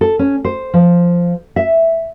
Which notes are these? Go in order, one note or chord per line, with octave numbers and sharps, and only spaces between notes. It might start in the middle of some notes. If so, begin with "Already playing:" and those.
A4
C#4
C5
F3
E5